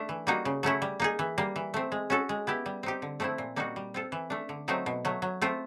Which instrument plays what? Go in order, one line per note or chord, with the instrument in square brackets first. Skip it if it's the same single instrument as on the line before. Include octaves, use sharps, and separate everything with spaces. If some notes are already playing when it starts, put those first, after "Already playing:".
Already playing: [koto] A3 D4
E3
G3 A#3 D#4 F#4
C#3
F#3 A3 C#4 E4
G3
A#3 D#4 G#4
E3
G3 A#3
E3
A3 C4
G#3
C#4 F#4 A4
G#3
B3 E4 G4
G3
C4 D#4 G4
D3
F3 A3 C4 E4
A#2
G3 A#3 D#4 F#4
G3
C4 F4 A4
E3
A3 D4
D3
F#3 A3 C4 D#4
B2
F#3 A3
F#3
A3 C4 F4